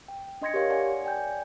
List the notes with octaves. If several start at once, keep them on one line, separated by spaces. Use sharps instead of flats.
G5
D4 D#5 C6 G#6 A#6 C#7
G4 A#4 C#5 F5 C6
D5 F#5 G#5 C#7
D5 G5 G#5 G6